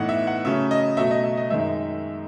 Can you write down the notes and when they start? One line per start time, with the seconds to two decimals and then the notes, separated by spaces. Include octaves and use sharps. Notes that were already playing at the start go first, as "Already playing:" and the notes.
Already playing: A2 E3 B3 D#4 F#5
0.09 E5
0.27 F#5
0.45 C#3 F#3 A3 C#4 E5
0.71 D#5
0.97 B2 F#3 A3 E5
1.11 D#5
1.24 E5
1.37 D#5
1.50 F#2 D#3 G#3 D#4 E5